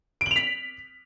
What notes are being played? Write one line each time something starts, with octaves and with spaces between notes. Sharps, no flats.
B6 D7 F7 F#7